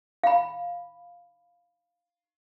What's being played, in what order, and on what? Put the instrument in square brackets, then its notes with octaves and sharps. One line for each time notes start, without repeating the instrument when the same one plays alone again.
[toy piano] F5 B5